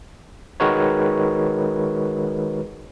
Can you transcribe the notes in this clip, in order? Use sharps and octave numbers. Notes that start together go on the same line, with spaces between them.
D#3 G#3 F#4 A#4 B4 C#5